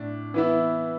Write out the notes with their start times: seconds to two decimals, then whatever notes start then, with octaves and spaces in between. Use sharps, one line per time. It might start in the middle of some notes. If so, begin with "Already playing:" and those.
Already playing: A2 D4
0.34 E3 B3 E4